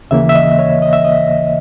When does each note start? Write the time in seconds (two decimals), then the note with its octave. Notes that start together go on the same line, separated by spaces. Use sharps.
0.11 D#2 C#3 E3 A#3 E5
0.29 E5
0.35 D#5
0.59 C#5
0.82 D#5
0.93 E5
1.04 D#5